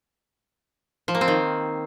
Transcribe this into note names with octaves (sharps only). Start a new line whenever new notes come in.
F3
A#3
C4
D#3